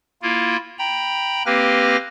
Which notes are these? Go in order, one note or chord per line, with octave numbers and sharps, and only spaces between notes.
A#3 E4 F4
G5 A#5 B5
A#3 C4 G4 B4 F6 A#6